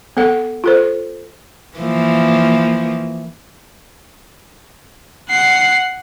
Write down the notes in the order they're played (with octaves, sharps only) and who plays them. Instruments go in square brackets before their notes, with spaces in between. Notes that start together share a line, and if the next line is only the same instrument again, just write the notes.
[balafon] B3 A4 F#5
F4 A4 C5
[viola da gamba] E3 F3 A#3
[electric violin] F#5 C7